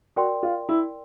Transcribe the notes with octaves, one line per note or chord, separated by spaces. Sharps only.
F#4 A#4 D5 G5 C6
F4
E4